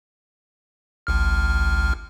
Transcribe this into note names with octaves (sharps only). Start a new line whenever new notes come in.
G#1 C#2 F6